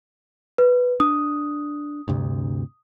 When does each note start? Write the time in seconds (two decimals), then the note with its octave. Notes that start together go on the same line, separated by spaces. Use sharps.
0.58 B4
1.00 D4 D#6
2.08 D2 G2 C3